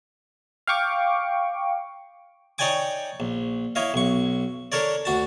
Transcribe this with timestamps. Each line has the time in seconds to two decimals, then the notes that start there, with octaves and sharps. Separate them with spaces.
0.67 F5 G5 C#6 D6
2.58 D#4 C#5 D5 G5 G#5 D6
3.20 A#1
3.75 E4 C#5 D#5 F5
3.94 B1 C#6
4.72 D4 A4 A#4 C#5 D5
5.05 D2 F#4 A5